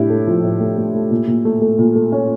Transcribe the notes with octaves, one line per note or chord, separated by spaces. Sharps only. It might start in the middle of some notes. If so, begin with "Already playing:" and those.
Already playing: A2 D4 E4 G4
A3
F3
A2
A3
A3
A3
A#2
A#2
A3
A3
A#2
A3
C#4